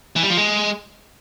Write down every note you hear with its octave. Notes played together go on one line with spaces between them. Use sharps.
E3
G3
F3
G#3